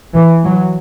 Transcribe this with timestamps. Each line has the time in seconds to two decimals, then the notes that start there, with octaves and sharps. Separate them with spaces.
0.14 E3
0.43 F#3